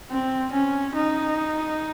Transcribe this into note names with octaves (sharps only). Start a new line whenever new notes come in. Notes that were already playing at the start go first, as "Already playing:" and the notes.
C4
C#4
D#4